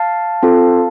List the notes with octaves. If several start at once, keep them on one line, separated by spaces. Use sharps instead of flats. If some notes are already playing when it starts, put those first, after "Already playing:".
Already playing: F5 A5
C4 F4 A4